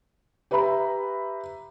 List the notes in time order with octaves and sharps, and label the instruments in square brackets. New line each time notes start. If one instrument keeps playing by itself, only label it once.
[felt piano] G4 B4 E5 A#5 B5